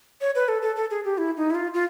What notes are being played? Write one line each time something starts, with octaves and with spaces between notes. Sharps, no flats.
C#5
B4
A4
A4
A4
G#4
G4
E4
D#4
E4
F4
F4